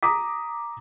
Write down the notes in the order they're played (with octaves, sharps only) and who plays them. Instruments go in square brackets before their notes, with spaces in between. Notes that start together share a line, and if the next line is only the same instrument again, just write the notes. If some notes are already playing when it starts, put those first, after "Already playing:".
[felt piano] A#5 D6 D#6 B6